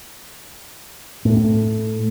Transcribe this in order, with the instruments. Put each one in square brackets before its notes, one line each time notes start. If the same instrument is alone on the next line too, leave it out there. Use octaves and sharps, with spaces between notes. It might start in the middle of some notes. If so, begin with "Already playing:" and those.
[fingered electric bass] A2